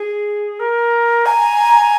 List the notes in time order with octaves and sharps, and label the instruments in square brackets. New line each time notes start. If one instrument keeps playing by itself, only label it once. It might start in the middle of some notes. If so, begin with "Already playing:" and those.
Already playing: [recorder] G#4
A#4
[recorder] G#5 [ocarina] A#5